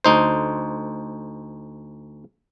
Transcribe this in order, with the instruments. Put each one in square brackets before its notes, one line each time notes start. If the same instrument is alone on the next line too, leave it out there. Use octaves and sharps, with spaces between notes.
[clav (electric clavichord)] D2 D#4 C5